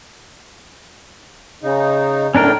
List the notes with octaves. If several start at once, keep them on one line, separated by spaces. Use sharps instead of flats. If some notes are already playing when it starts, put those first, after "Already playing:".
C#3 D#4
A2 C#4 D4 A#4 G5